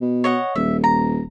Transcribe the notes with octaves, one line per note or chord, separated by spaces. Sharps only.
B2
C#5 D#5 F#5
D#1 E5
A#5